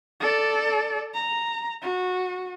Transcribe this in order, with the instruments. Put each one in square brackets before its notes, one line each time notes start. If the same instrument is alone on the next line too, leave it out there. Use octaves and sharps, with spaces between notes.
[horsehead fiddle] A4 D5
A#5
F#4